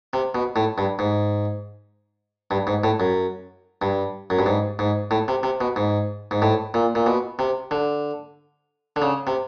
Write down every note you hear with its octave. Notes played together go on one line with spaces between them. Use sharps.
C3
B2
A2
G2
G#2
G2
G#2
A2
F#2
G2
F#2
G2
G#2
G#2
A2
C3
C3
B2
G#2
G#2
A2
A#2
A#2
B2
C3
D3
D3
C#3
C3